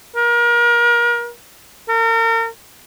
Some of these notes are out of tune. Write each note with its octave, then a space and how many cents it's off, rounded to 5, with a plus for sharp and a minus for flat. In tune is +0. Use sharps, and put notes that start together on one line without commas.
A#4 +35
A#4 -35